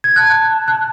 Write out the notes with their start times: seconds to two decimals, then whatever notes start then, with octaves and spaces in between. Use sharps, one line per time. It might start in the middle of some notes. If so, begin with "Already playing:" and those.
0.04 G#6
0.16 A5 F#6
0.68 F#6